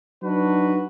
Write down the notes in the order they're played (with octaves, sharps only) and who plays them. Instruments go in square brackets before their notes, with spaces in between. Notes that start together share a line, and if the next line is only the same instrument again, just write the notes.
[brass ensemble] F#3 D4 D#4 F#4 B4